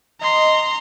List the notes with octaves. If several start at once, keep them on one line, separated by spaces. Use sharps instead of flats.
D#5 A#5 C6